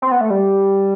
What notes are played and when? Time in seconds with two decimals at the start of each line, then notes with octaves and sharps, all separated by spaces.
0.02 C4
0.12 B3
0.21 A3
0.30 G3